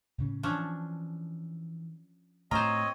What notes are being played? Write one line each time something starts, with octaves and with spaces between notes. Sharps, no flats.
A2 C#3 C#4
E3 F3 C#4 D4
A2 C4 F4 C5 C#5 D#5 A#5